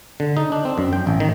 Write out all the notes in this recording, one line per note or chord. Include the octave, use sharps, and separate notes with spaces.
D3
D#4
D4
C4
F#2
G5
A1
D#3